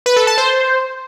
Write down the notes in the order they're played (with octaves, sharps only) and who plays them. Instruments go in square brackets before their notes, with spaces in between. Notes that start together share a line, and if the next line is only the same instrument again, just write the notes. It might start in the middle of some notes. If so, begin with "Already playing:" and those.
[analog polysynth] B4
A4
A5
C5